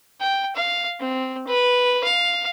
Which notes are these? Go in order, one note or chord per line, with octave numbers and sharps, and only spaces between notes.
G5
F5
C4
B4
F5